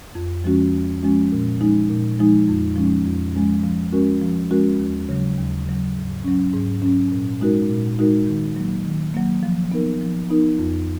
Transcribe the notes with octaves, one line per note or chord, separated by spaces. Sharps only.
F2
F3 G#3 C#4 F#4
F2
F3 G#3 C#4 F#4
A#2
F3 G#3 D#4
A#2
F3 G#3 D#4
F2
F3 G#3 C#4
F2
F3 G#3 C#4
F3
G#3 C#4 F#4 A#4
F3
G#3 C#4 F#4 A#4
D#2
C#3 F#3
D#2
C#3 F#3
G#2
F#3 C#4
G#2
F#3 C#4
A#2
G#3 D#4 F#4 A#4
A#2
G#3 D#4 F#4 A#4
D#3
F#3 A#3
D#3
F#3 A#3
F3
B3 D#4 A#4
F3
B3 D#4 A#4
F2